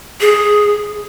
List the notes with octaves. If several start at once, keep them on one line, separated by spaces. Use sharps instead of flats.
G#4